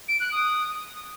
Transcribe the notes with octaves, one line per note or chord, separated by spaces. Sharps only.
D7
F#6
D#6